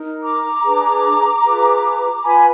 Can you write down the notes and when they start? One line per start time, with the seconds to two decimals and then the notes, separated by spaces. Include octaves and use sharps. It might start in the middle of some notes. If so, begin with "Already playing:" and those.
Already playing: D#4 A#4
0.22 A#5 D6
0.64 D4 G#4 B4
1.44 F4 G#4 B4
2.24 F4 B4 G#5 B5